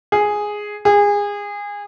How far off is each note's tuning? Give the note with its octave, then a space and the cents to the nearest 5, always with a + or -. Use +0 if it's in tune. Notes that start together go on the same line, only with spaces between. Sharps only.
G#4 +0
G#4 -25